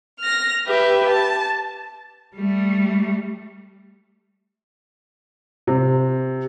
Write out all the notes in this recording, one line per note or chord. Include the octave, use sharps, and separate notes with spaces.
F6 A#6
G4 B4 E5
A5
G3 A3
C3